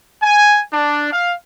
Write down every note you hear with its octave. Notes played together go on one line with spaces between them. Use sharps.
G#5
D4
F5